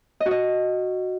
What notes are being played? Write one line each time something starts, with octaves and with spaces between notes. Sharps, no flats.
D#5
F#4
D#5